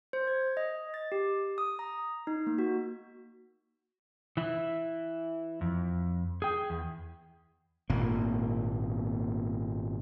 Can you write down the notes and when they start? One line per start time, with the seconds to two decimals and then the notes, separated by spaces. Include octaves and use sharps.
0.13 C5
0.27 G#6
0.57 D#5
0.94 A6
1.12 G4
1.58 D#6
1.79 A#5
2.27 D#4
2.47 A#3
2.58 F#4
4.37 E3 E4
5.61 F2
6.42 G#4 G5
6.70 E2
7.90 G#1 A#2 A#3